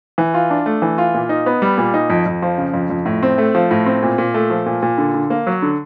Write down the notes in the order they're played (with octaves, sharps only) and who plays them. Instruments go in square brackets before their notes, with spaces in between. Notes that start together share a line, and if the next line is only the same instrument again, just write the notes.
[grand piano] E3
F4
D4
A3
E3
F4
A#2
D#4
B3
G3
A#2
D#4
F2
F2
F3
C#3
F2
F2
A2
C4
A3
F3
A2
C4
A#2
A#2
A3
F3
A#2
A#2
D3
D3
A#3
F#3
D3